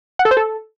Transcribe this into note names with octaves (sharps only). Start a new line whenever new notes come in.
F#5
A4
C5
A4